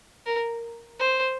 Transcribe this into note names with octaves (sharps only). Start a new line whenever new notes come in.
A#4
C5